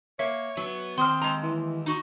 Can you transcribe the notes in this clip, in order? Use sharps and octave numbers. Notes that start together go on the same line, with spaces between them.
A#3 C#5 E5
F#3 B3
D#2 C4 C6 D#6 F6
G#3 A#5
E3
D#4 F#4